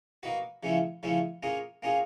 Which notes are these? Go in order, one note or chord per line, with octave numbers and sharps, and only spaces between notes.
A#3 D#4 F#4 B4
C#3 F3 A3 C#4 E4
C#3 F3 A3 C#4 E4
A#3 C#4 F4 G#4
A#3 C#4 F4 G#4